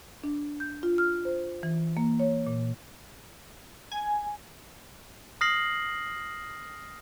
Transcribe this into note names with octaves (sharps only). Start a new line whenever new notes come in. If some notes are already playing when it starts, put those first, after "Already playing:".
D4
G6
F4
F6
C5
E3
A#3
C#5
A#2
G#5
D#6 F6 A#6 C7 F#7